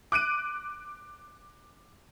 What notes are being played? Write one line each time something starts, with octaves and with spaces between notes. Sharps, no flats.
D6 F#6 D7 D#7